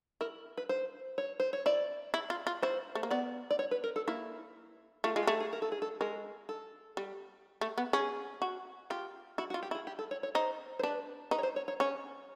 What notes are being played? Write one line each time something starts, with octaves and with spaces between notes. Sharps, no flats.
E4 A#4
B4
C5
C#5
C5
C#5
E4 D5
E4
F4
F4
E4 C5
A3
A#3
B3 D5
D5
C#5
B4
A#4
A4
A#3 E4
A3 F4
G#3 F4
G4
A3 G#4
G#4
A#4
A4
G#4
A4
G#3 A#4
A4
G3
A3
B3
C#4 G#4
F#4
F4 G4
E4 F#4
F#4
F4
G4
E4 G#4
G4
A4
C#5
C#5
D#4 C5
C5
D4 B4
D#4 B4
C#5
C5
C#5
C#5
C#4 C#5